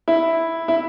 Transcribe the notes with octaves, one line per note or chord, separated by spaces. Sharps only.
E4
E4